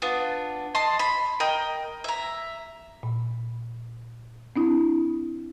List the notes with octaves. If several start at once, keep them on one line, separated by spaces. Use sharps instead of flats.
B3 D4 F4
D#5 A5 C6
B5
A#4 D#5 G5
E5 A#5
A#2
C4 D4 E4